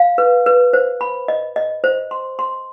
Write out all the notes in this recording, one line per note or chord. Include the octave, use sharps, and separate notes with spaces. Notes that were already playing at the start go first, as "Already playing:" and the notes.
Already playing: F5
B4
B4
C5
B5
D#5
D#5
C5
C6
C6